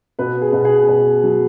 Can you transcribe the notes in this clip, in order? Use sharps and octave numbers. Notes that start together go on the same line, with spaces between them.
B2 B4
G#4
B2
G#4
B2
F#3